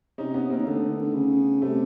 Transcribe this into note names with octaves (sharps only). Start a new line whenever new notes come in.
C3 C#4 D#4
B3 C#4
A#3 C4
D#3
D3 A3 B3
D#3
D3
C#3
C3 G3 A3